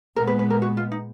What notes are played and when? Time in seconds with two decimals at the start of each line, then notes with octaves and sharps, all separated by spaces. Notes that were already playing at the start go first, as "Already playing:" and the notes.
0.16 A#2 G#3 B3 A#4
0.27 B4
0.39 B4
0.50 A#4
0.62 F#4
0.77 F4
0.92 D#4